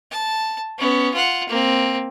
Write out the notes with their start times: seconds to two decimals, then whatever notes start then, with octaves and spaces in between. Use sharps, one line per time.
0.11 A5
0.78 B3 C#4
1.14 F4 F#5
1.49 A#3 C4